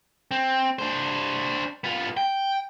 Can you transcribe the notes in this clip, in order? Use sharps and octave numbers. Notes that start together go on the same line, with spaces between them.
C4
D4 C5
B3 F4
G5